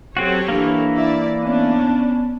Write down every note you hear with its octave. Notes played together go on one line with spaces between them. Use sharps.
F#3 C4 F#4 G4 A4 C#5
E3 A#3 D4
E4 D5
B3 C#4 D4 D5